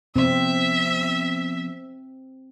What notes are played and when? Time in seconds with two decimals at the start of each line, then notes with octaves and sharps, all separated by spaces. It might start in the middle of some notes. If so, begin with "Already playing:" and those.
0.16 C3 F3 B3 C4 E5